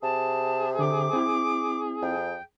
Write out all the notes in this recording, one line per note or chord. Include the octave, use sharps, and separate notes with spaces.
C3 G#4 A5
D3 A4 D6
C4 E4
F2 G5